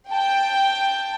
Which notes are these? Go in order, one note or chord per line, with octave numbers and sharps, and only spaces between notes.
G5 A5